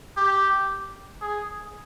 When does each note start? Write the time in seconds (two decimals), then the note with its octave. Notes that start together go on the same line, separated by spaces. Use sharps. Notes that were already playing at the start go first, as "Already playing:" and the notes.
0.17 G4
1.22 G#4